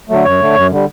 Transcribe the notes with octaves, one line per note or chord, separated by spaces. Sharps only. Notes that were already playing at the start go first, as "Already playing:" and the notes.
D3 F#3 A3
F#2 C#5
D3 A3
F#2
D3 G3